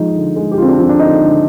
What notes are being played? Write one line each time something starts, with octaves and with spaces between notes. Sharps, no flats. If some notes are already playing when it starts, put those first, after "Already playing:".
Already playing: F3 G#3 D#4
D3
G#3
G4
D3 C4 F4
D4
F3 C4
D4
D3 D#4
D3